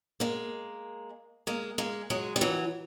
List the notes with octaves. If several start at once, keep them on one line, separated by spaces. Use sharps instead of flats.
G#3 A#3
G#3 A#3
G#3 A#3
F#3 G#3
G3
E3 F#3